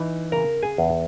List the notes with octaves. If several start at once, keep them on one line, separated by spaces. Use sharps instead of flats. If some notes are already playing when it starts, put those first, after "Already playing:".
Already playing: E3 D#4
C#3 A#4 A#5
G#4 G#5
E2